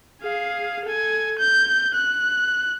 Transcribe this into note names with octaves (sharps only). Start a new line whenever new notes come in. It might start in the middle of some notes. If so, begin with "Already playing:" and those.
G#4 F5
A4 G#5
G6
F#6